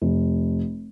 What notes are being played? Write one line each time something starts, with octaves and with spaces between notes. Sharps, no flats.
F1